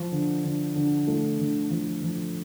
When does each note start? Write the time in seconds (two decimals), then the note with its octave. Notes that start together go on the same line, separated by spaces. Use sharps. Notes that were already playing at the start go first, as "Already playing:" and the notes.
Already playing: F3
0.12 D3
0.44 D3
0.76 D3
1.07 A3
1.39 D3
1.70 F3
2.02 F3